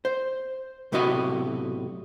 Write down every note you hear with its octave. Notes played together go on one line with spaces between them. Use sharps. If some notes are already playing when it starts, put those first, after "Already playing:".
C5
B1 A2 C3 F#4 D#5 B5